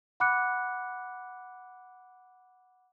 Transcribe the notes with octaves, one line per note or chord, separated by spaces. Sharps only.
F#5 B5 D6 F#6 C#7